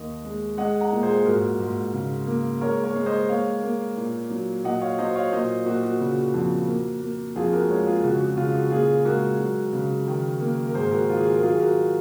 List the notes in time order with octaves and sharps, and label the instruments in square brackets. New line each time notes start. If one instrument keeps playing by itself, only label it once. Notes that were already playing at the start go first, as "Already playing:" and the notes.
Already playing: [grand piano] D#2 D#5
G#3
G#3 D#5 F#5
F#5 A#5
A#2
G#4 C5
G#2 F#4 A#4
G#2
C#3
A#3
G#3 A#4 C#5
A#4 C#5
G#3
C5 D#5
A#3 C#5 F5
A#3
A#2
F#3
A#2 D#5 F#5
C#5 F5
F#3 C5 D#5
C#5 F5
A#2 C5 D#5
A#2 F#4
F#4
C#3
F2
A#3
A#3
F2 F4 G#4
F#4 A#4
G#3 A#4 C#5
F4 G#4
C#3 F#4
F#4
C#3 F4
F#4
A#2 F4 G#4
G#3 F#4 A#4
F#3
C#3
D#3
A#3
A#4
G#2 G#4 C5
F#4 A#4
D#3 F4
G#4
F#4
A#4
F#3 F4 G#4
F#4 A#4